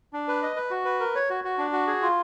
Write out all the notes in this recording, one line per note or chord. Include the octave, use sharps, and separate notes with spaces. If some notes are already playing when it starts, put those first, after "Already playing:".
D4
B4
D#5
B4
F#4
B4
A#4
C#5
F#4
F#4
D4
F#4
G#4
F4